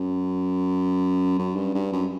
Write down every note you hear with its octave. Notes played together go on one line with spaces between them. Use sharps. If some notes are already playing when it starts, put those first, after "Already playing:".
Already playing: F#2
F#2
G2
G2
F#2